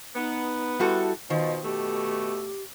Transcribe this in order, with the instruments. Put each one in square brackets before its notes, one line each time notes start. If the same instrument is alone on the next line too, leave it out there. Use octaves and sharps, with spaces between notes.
[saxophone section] B3 [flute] D#4
[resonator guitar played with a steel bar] G3 F#4 A4 [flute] E4
[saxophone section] B2 F3 [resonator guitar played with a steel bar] D#3 [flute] D#5
[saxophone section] B2 A3 [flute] G4